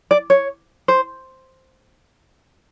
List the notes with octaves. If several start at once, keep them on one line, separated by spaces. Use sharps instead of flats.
D5
C#5
C5